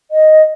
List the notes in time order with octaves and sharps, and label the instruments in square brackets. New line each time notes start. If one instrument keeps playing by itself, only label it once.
[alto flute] D#5